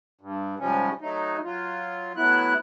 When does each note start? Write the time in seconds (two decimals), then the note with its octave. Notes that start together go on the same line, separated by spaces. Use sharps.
0.21 G2
0.60 G#2 C3 F3 G3 C#4
1.01 F#3 A3 D#4
1.43 F#3 F4
2.16 A2 F#3 B3 E4 F#6